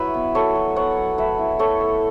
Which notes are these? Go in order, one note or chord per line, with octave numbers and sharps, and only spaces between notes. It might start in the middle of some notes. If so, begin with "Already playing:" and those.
Already playing: F#3 E4 B4 C#5 E5
B3
F#3 A4 C#5
F#3
B3 C#5 F#5
F#3
A3 B4 E5
E4
A3 A4 C#5
A3